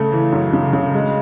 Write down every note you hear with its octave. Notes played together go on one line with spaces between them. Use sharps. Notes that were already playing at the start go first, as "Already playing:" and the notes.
Already playing: C#3 A3
E3
F#2
C#3
C#3
G#3